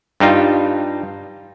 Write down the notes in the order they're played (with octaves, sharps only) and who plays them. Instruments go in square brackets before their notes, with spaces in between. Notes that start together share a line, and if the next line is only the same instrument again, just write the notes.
[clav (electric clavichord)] G2 G3 D#4 F4